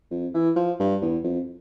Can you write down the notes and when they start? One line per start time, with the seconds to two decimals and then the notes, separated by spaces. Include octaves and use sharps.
0.11 F2
0.34 E3
0.56 F3
0.79 G2
1.02 E2
1.24 F2